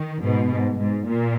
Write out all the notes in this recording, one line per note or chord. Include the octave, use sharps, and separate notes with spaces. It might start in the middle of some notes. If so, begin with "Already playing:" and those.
Already playing: D#3
G#2 B2
G#2
G#2
A#2